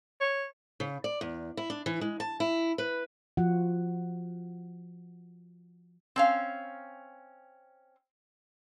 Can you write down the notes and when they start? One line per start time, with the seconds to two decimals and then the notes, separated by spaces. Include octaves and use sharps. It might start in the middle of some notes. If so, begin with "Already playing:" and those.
0.20 C#5
0.80 C#3
1.04 D5
1.21 E2
1.57 E4
1.70 D4
1.86 E3
2.01 G#3
2.20 A5
2.40 E4
2.78 B4
3.37 F3 F4 F#4 F#5
6.16 C4 C#4 F5